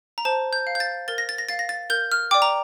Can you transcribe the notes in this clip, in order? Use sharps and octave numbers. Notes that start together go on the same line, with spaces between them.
A#5
C5 A5
G6
F5
G6
A6
A#4 A6
A#6
A6
A#6
F5 A6
A#6
A6
A#4 G6
F6
D5 G5 D6
A#5